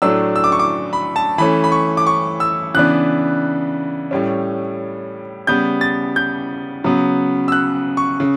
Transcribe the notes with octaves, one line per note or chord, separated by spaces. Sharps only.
A2 F#3 A3 D4 E6
E6
D6
C#6
D6
B5
A5
E3 A3 C#4 B5
B5
C#6
D6
C#6
E6
C#3 E3 B3 D4 F#6
A2 G3 C#4
C#3 G3 B3 G6
A6
G6
C#3 F#3 B3
E6
F#6
C#6
C#3